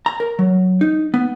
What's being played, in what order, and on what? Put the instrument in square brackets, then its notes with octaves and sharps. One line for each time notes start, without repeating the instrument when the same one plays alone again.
[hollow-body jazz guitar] A#5
A#4
F#3
D#4
B3